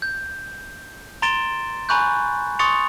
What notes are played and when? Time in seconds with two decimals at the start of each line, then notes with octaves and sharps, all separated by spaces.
0.02 G6
1.22 A#5 C6 A6 D7 E7 G7
1.89 G#5 A#5 B5 C#6 F#6 G6
2.59 C6 C#6 D#6 A6 C#7 F7